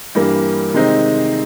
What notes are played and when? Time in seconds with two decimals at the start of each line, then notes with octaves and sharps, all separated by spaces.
0.15 G2 E3 G3 A#3
0.74 C3 D#3 G#3 C4 D#4